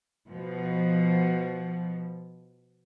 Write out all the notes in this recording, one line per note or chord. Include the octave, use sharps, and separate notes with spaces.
B2 F3